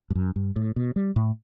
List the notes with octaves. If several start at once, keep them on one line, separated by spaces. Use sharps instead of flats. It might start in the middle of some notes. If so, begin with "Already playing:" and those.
G2
F#2
G2
A2
B2
G3
A2